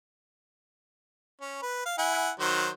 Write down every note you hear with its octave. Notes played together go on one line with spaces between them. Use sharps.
C#4
B4
F5
E4 F#5 G#5
D#3 F#3 C5